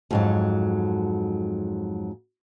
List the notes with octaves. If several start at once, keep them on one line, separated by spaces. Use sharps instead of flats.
F2 G#2 F#3